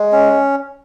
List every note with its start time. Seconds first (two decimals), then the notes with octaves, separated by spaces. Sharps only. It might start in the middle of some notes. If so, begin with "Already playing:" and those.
Already playing: G#3
0.12 C#4